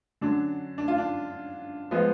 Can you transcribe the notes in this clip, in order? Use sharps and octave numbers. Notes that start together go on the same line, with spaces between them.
D3 F#3 C#4 D4
D4
F4
D4
F3 G#3 B3